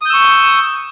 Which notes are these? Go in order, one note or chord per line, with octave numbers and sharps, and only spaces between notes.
C#6 D#6 E6 G6